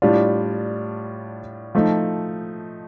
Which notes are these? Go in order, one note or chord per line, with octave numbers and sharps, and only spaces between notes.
A2 G3 D4 F4
F3 A3 D#4